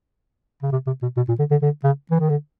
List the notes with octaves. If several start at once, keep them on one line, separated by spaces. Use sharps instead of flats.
C#3
C3
C3
B2
B2
A#2
D3
D3
D3
C#3
E3
D#3
D3